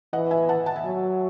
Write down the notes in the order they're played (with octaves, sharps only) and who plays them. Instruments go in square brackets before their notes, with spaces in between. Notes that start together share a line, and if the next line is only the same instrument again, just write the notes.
[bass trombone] E3 [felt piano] D#5 F#5
[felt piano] E5 G#5
F#5 A5
F#5 A5
E5 G#5
[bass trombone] F#3